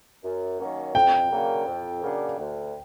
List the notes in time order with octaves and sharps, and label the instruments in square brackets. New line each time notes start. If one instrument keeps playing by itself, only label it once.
[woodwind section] F#2
D#3 F#3 A#3 C#4
[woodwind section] F2 [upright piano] G5
[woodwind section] C#3 F#3 A#3 D4
F2
C#3 F#3 A#3 D4
D2